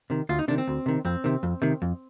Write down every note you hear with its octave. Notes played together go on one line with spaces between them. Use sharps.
C3 D#3
D2 F4
D#4
C3 D#3 D4
C4
D2
C3 D#3
F2 C4
C3 D#3
F2
C3 D#3
F2